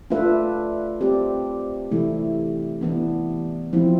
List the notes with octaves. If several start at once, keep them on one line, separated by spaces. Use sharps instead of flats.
A3 D4 F4 B4 E5
C4 G4 D5
C3 E3 A3 E4
E3 B3 D4
F3 C4 E4